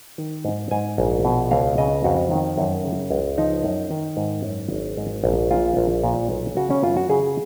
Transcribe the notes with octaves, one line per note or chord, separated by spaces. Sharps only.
D#3
G#2
G#2 G#5
A#1
B2
C#2 F5
C#3 D#5
F2 F#4
D#3
F#2
C#3
C#2
F3 D#4
F#2
D#3
G#2
F#2
G#1
G#2
A#1
A#2 F4
A#1
A#2
B1
C#3 F#4
C#4
F#2 F4
F#4
C#3 G#4